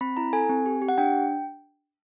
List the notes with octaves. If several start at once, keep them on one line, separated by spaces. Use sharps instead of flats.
C4 B5
E4 A#5
A4 G#5
C4
G4
G4
F#5
D4 G5